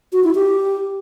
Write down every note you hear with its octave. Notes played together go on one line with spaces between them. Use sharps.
F#4
E4
G4